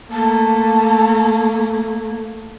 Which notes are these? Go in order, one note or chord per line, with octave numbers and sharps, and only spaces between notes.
A3 A#3 A5